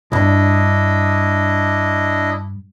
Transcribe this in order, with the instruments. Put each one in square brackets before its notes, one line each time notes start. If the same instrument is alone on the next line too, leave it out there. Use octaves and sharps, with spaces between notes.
[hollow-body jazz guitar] B1 G2 [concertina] D4 E4 D#5